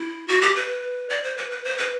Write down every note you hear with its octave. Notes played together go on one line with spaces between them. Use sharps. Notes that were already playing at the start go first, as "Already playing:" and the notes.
Already playing: E4
F#4
G4
B4
D5
C5
B4
B4
C5
B4